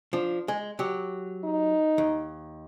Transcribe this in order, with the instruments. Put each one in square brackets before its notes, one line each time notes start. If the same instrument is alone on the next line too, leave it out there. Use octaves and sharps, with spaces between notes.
[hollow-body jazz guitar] F3 D4
G#3
F#3 G4
[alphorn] D#4
[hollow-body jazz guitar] D#2